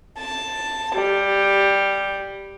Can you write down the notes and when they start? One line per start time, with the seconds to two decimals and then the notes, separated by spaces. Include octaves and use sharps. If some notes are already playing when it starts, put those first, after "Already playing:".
0.19 A5
0.97 G3